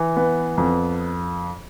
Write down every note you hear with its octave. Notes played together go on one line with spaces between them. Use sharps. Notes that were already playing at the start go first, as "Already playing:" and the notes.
Already playing: E3
B3
F2